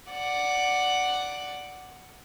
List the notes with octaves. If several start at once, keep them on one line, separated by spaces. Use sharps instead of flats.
D5 F#5